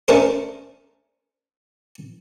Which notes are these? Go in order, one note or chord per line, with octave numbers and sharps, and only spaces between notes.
A3 C#4 D4 A#4 C5